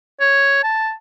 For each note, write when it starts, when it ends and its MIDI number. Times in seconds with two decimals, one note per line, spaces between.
0.20 0.60 73
0.63 0.92 81